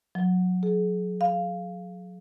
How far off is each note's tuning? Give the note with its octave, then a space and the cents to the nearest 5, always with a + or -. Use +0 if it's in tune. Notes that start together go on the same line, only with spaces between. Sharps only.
F#3 -25
G#4 +35
F5 -5